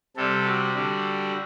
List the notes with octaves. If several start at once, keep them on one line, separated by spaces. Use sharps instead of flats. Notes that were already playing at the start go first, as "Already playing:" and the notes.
C3 G3 A4
F#4
D3 G3